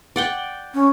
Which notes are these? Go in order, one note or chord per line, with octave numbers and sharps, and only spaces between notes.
D5 F#5 G5
C#4